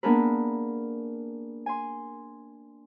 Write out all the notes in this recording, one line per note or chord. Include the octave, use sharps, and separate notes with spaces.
A#3 B3 D4 G#4 A#4 B4
G#5 C6